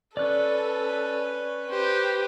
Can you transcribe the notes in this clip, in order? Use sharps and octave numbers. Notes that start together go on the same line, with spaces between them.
C#4 A4 B4 D5 F#6
G4 B4 C5